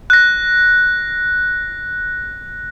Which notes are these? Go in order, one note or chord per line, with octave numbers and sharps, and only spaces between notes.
F#6 A#6